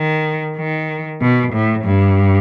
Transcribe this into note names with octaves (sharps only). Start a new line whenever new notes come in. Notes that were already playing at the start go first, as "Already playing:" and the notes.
Already playing: D#3
D#3
B2
A2
G2